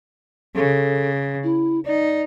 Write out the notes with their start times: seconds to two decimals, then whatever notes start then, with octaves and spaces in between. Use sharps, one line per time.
0.55 C#3 A4
1.44 E4
1.86 D#4 D5